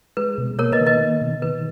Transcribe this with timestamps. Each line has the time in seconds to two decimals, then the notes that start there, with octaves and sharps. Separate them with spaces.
0.17 G#3 B4
0.38 B2
0.59 A#3 A#4 C#5
0.72 B4 D#5
0.80 D#3
0.87 B4 D#5
1.01 A#3
1.21 B2
1.42 D#3 B4